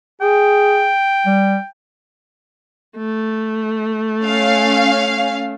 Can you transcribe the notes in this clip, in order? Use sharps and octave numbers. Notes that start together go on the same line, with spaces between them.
G#4 G5
G3
A3
C#4 F5